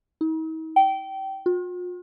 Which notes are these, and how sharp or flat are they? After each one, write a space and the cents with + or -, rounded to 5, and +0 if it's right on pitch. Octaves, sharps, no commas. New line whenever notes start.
D#4 +45
G5 -20
F4 +45